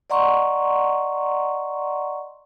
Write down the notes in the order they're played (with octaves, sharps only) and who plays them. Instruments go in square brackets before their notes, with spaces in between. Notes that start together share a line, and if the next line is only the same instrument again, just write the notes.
[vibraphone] D5 D#5 F#5 A#5 C6 C#6